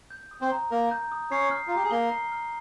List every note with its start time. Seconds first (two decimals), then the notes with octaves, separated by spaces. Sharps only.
0.10 G6
0.31 D#6
0.41 C4 C5
0.51 A#5
0.71 A#3 A#4 A#5
0.91 G6
1.12 D#6
1.31 C#4 C#5 C7
1.51 F6
1.68 F4
1.71 G4 A#5
1.84 G#4
1.91 A#3 A#4 G7
2.11 C7
2.32 F6